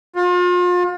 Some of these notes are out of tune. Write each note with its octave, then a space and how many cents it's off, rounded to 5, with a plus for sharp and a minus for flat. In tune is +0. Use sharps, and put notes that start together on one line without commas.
F4 +35